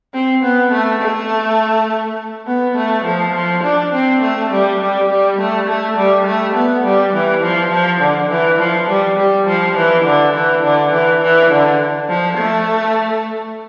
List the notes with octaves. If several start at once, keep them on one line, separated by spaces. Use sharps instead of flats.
C4
B3
A3
A3
B3
A3
F3
F3
D4
C4
A3
G3
G3
G3
A3
A3
G3
A3
B3
G3
E3
F3
F3
D3
E3
F3
G3
G3
F3
E3
D3
E3
D3
E3
E3
D3
F3
A3